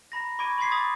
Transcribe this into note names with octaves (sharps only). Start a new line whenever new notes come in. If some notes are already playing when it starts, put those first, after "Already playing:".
A#5 B5 A#6
B5 C#6 D6 G#6 D7 D#7
B5 C6 D6 G#6 B6 C7
B5 D6 D#6 A6